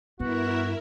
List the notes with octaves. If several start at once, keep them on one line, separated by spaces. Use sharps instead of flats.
G2 B3 E4 F#4 A#4 E5